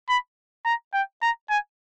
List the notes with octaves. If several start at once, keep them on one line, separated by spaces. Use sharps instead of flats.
B5
A#5
G5
A#5
G#5